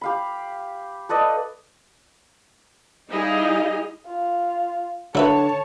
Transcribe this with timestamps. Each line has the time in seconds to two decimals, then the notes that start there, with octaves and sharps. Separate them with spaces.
0.01 G4 F5 B5
1.09 A4 B4 D5 D#5
3.10 G3 D#4 E4 G#4 D#5 F5
4.07 F4
5.15 D3 F#3 E4 B4 C#5 A5